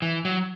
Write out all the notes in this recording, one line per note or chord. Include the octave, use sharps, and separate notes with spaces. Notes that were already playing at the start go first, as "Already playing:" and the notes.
E3
F#3